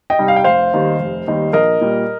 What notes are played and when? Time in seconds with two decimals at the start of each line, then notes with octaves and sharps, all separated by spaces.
0.10 D#5 G5
0.19 C3 G3 D#4
0.28 F5
0.36 G5
0.44 F1 C5 F5
0.73 D#2 D#3 G3 D#4
0.99 F1
1.27 D#2 D#3 G3 D#4
1.53 A#1 A#4 D#5
1.81 A#2 G3